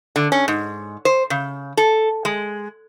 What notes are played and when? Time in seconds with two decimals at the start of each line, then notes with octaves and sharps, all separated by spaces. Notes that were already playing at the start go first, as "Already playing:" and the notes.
0.16 D3
0.32 C#4
0.48 G#2
1.05 C5
1.30 C#3
1.77 A4
2.25 G#3